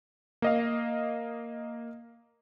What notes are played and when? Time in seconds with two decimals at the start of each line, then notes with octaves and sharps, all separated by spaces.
0.42 A#3 D#5 F5